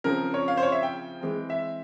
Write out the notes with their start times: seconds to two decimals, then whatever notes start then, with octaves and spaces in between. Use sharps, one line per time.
0.04 C#3 F3 C4 A#4
0.34 C#5
0.48 F5
0.57 C5
0.63 C#5
0.72 E5
0.83 G5
1.21 E3 G#3 C4
1.50 E5